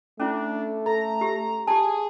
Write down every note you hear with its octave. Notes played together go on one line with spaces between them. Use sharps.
A3 C#4 D4 E4
A4 A#5
G4
G4 G#4 A5